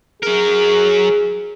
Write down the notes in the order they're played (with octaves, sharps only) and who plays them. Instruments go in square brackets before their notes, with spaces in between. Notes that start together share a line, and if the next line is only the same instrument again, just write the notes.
[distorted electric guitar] F#3 A#4 [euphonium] G#4